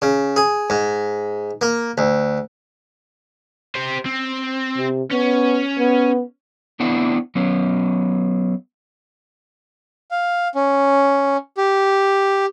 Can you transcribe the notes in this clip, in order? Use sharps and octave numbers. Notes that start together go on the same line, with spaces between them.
C#3
G#4
G#2
A#3
D2
G4 C5
C4
C3
B3 C#4
B3
A3 B3 C4 D4 E4 F#5
F#3 B3 C#4
F5
C#4
G4